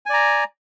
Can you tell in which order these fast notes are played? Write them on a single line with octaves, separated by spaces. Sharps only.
G#5 D5 A#5